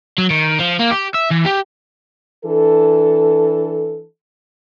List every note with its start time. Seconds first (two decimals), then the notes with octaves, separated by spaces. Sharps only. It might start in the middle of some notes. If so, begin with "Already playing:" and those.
0.18 F#3
0.30 D#3
0.59 F3
0.79 A#3
0.91 G4
1.14 E5
1.31 E3
1.46 G4
2.45 E3 D4 A4